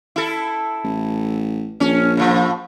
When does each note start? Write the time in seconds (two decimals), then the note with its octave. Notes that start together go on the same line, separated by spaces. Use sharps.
0.16 E4 A4
0.84 A1
1.80 A#1 C#4
2.17 A2 F3